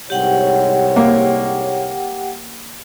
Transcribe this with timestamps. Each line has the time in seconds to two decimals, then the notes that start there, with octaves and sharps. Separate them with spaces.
0.10 C2 G#2 G4 C#5 F#5 G5
0.96 A#3